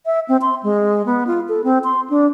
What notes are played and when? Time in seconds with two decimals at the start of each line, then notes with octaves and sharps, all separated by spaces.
0.06 E5
0.29 C4
0.41 C6
0.63 G#3
1.06 B3
1.27 F4
1.49 A4
1.64 C4
1.84 C6
2.10 D4